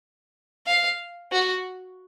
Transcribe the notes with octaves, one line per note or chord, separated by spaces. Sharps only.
F5
F#4